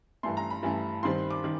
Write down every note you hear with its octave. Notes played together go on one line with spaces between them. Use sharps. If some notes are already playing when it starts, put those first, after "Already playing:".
G2 E3 A3 C6
A#5
B5
G2 E3 A3
G2 D#3 G3 C4 C6
D6
D#3